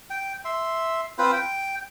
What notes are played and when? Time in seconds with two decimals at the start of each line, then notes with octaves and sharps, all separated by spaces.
0.10 G5
0.45 E5 C6
1.18 C4 F4 B4 C5
1.33 G5